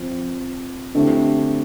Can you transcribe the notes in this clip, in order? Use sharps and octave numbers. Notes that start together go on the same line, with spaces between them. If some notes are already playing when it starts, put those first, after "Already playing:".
Already playing: F3 C4
D3 A3 C4 E4 G4